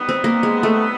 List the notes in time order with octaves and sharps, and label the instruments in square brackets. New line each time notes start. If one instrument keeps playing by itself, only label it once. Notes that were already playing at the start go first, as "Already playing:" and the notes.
Already playing: [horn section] D#3 G3 B3
[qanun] C4
A#3
G#3
A3